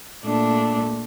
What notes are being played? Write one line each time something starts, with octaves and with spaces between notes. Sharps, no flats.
A#2 A3 D4